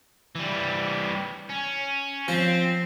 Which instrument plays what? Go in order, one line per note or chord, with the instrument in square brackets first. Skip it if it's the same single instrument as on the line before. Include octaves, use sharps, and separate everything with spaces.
[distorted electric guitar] E3 G3
C#4
[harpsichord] F3 [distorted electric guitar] C4